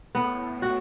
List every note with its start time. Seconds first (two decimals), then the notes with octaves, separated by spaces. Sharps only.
0.15 A2 B3
0.62 F#4